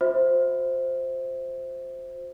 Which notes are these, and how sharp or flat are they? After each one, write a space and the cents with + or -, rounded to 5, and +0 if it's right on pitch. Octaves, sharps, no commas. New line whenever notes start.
F#4 -45 C5 +0 E5 -15